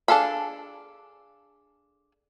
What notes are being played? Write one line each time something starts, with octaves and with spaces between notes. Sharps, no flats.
D4 G#4 A4 F5 B5